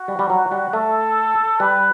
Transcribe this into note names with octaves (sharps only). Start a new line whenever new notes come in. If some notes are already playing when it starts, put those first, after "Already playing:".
Already playing: F#4
G3
G3
F#3
G3
A3 A4
G3 B4